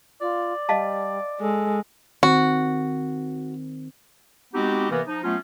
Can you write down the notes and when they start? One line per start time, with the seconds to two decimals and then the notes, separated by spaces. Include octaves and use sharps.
0.21 F4 D5
0.69 G3 D#5 F5 A5
1.41 G#3 A4
2.23 D#3 C4 F#4
4.54 G#3 B3 C4 D#4 F#4 G4
4.90 C3 E3 A#3 B3 A#4 B4
5.07 F3 D#4
5.24 F#3 A3 B3 C#4 F4